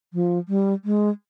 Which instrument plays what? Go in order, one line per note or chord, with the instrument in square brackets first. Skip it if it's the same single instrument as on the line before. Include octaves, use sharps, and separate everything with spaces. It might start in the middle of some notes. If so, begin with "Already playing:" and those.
[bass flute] F3
G3
G#3